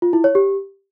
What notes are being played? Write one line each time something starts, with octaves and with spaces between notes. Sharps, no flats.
F4
E4
C#5
G4